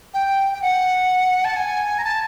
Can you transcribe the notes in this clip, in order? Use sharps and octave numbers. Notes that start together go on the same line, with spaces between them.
G5
G5
F#5
A5
G#5
A#5
A5